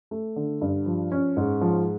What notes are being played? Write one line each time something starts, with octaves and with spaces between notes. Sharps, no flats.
A3
D3
G2
F3
C#4
G#2
F3